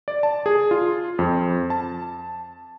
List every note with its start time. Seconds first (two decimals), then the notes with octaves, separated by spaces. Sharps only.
0.08 D5
0.23 A5
0.46 G#4
0.71 F4
1.19 F2
1.70 A5